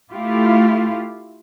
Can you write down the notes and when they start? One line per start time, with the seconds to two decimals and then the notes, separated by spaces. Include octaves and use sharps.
0.11 A3 E4 F4 G4